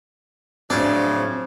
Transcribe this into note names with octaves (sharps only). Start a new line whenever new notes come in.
A2 C#3 F3 F#3 C4 D4